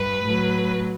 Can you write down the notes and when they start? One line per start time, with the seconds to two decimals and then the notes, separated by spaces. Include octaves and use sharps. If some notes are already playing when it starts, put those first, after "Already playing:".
Already playing: G2 B4
0.24 A2 F#3